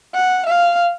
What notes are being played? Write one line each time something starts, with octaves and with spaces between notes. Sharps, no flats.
F#5
F5